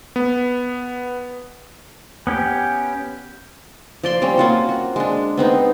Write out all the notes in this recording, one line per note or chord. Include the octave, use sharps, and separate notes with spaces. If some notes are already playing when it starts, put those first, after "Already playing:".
B3
B3 C#4 G4 G5
F3 D5 C6
G3 C4 C#4
A#3 F4 F#4
F#4
G#3 D4
B3 C4 D#4